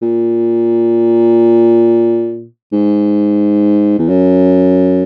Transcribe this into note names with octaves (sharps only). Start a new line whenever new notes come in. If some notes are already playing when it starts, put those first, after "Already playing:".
A#2
G#2
E2
F#2